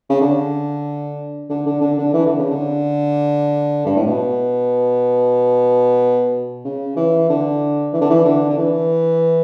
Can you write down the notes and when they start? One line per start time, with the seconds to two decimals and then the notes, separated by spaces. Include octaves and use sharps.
0.10 C#3
0.21 D3
1.50 D3
1.66 D3
1.81 D3
1.98 D3
2.13 E3
2.26 D3
2.39 C#3
2.51 D3
3.86 G2
3.96 A2
4.07 B2
6.64 C#3
6.96 E3
7.29 D3
7.93 E3
8.01 D3
8.10 E3
8.25 D3
8.50 D3
8.58 E3